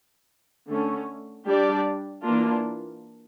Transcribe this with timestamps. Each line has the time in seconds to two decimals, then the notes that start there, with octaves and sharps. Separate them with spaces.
0.68 D3 A3 C#4
1.45 G3 D4 G4 D5
2.22 E3 A#3 D4 F4